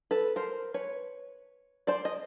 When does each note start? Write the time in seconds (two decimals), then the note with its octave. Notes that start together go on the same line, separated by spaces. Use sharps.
0.11 A4 B4
0.36 A#4 C5
0.74 B4 C#5
1.87 C5 D5
2.05 D#5